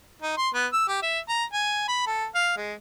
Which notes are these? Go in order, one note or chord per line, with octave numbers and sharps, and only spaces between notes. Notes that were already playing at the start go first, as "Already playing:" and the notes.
D#4
C6
B3
E6
G4
E5
A#5
G#5
B5
A4
F5
G#3